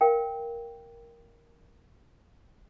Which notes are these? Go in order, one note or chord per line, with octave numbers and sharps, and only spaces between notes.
A#4 F5 G5